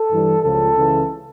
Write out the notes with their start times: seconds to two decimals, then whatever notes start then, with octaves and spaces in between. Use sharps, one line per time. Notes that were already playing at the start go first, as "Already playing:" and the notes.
Already playing: A4
0.10 G2 E3 G3
0.43 C#2 C#3 F3 A4
0.76 C#2 C#3 E3